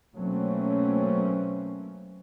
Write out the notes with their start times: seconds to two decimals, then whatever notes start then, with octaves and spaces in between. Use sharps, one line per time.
0.16 B2 F#3 A3 A#3 C4 C#4